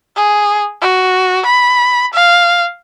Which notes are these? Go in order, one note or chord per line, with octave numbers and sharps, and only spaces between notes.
G#4
F#4
B5
F5